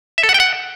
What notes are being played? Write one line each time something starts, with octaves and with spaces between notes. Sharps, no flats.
E5
A4
F#5
G5
F#5